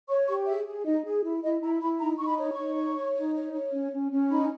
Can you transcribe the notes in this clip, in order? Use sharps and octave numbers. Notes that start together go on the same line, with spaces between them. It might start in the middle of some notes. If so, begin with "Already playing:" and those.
C#5 C#6
G4 C#6
G#4 E5
G#4
D#4 D#5
G#4
E4
E4 D#5
E4 A#5
E4 B5
D#4 A#5
D#4 C#6
B5
C#5
C#6
D#4
C#5
C#5
D#4
C#5
C#5
C#4
C#4
C#4
D#4 B5